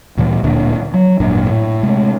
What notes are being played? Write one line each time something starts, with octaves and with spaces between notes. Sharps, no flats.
D2 A#2 E3 G3
D1 D2 A#2 D3
F#3
G#1 F#2 A#2 D4
A2
C3 G#3 A3